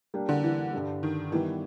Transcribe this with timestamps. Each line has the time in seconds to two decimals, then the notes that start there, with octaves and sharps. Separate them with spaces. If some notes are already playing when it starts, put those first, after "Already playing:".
0.14 G3 A#3 D4 G4
0.29 D3
0.43 E3
0.73 G2 D3 G3
1.03 D#3
1.32 D#3 E3 G3 B3 E4